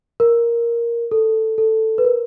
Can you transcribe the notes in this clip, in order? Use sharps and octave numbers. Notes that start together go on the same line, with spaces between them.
A#4
A4
A4
B4
A#4